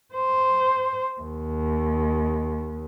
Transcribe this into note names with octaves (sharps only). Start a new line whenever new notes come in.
C5
D#2